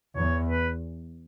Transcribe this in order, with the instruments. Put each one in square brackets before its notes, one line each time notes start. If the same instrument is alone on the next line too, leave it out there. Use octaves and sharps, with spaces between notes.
[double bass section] E2 [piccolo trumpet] C#5
[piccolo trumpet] B4